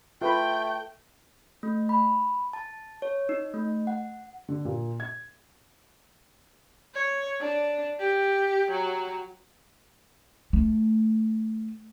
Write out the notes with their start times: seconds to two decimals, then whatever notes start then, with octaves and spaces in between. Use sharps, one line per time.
0.21 A3 F4 B4 G5 B5
1.63 A3
1.89 B5
2.53 A5
3.02 C#5
3.29 D#4
3.54 A3
3.87 F#5
4.49 D3
4.65 A#2
5.00 G#6
6.94 C#5
7.40 D4
7.99 G4
8.71 F#3
10.53 A3